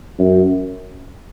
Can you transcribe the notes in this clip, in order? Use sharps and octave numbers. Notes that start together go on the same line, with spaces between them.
F#2